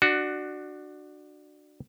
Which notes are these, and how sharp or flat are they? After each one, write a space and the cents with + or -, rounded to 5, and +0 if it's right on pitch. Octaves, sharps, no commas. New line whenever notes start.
D4 +20 F#4 +0